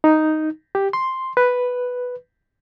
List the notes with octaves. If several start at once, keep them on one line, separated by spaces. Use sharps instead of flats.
D#4
G4
C6
B4